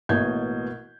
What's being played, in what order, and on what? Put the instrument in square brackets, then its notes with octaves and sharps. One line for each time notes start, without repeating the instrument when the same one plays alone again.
[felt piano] A1 B2 A#3 D#5 G6 G#6